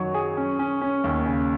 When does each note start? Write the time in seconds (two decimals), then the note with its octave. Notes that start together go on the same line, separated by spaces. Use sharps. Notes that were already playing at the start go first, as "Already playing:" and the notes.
Already playing: F#2 D#3 F#3
0.14 G#4
0.37 C#4
0.59 C#4
0.81 C#4
1.04 D#2
1.26 C#3